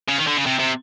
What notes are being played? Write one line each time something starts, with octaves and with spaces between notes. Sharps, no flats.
C#3
D#3
D3
C#3
C3
C3